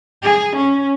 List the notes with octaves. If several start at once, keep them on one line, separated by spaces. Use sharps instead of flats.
G#4
C#4